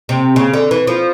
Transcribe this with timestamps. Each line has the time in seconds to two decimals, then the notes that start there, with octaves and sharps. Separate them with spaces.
0.09 C3
0.36 C#3
0.54 D3
0.71 E3
0.87 F3